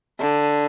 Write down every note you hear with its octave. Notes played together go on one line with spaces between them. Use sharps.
D3